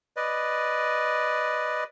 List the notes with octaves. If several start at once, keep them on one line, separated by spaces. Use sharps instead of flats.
B4 D5 D#5